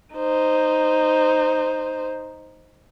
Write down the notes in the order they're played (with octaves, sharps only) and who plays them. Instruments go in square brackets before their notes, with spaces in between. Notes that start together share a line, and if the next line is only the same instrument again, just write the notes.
[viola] D#4 C5